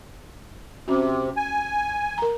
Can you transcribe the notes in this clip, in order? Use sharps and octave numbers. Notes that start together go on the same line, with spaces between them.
C3 C#4 F#4
G#5
A#4 A#5